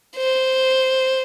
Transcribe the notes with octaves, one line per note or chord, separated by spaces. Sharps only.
C5